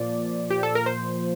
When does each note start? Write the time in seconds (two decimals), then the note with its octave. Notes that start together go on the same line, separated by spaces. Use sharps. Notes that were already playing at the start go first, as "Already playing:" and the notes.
Already playing: A#2 F3 D5
0.50 G4
0.63 A4
0.75 A#4
0.86 C5